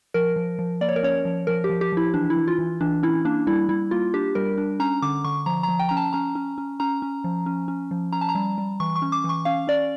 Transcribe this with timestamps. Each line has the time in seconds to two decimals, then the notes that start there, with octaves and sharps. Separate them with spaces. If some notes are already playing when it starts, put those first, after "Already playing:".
0.14 F3 A#4
0.36 F3
0.59 F3
0.81 A#3 D5
0.89 C#5
0.96 A#4
1.03 C#4 C#5
1.25 F3
1.47 F3 A#4
1.64 G4
1.69 F3
1.81 G4
1.92 F3 E4
2.14 E3 D4
2.30 E4
2.36 E3
2.48 F4
2.59 E3
2.81 E3 D4
3.03 C#4 E4
3.25 A#3 D4
3.47 G3 E4
3.69 G3 E4
3.91 A#3 F4
4.14 D4 G4
4.35 G3 A#4
4.58 D4
4.80 C#4 A#5
5.02 D3 D6
5.24 D3 C#6
5.46 F3 A#5
5.63 A#5
5.68 F3
5.79 G5
5.89 C#4 A#5
5.97 A5
6.13 C#4 A#5
6.35 C#4
6.58 C#4
6.80 C#4 A#5
7.02 C#4
7.24 F3
7.46 C#4
7.68 C#4
7.91 F3
8.12 C#4 A#5
8.21 A5
8.29 A#5
8.35 G3
8.58 G3
8.80 E3 C#6
8.96 C#6
9.02 C#4
9.12 D6
9.24 E3
9.29 C#6
9.45 C#4 F5
9.68 C#4 D5